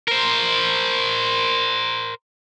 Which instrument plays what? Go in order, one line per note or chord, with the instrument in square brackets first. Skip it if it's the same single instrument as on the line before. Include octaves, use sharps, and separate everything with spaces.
[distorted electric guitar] A#4 C5